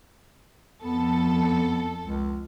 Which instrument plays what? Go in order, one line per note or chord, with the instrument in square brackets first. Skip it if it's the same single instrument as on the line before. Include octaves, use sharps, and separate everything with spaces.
[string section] F2 A4 [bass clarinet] B3
[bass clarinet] C#2